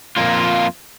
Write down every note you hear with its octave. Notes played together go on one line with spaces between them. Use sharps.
F2 A#3 F4